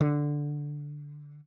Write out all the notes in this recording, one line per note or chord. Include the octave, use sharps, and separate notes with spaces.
D3